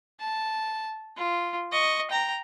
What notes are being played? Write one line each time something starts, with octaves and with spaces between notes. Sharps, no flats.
A5
F4
D#5 C#6
G5 A#5